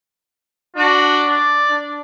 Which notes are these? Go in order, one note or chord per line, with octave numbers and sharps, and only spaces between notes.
D4 F#4
D5
D4